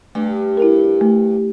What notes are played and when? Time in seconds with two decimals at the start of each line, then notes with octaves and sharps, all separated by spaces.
0.15 G2 A3
0.57 E4 G4 A#4
1.01 A3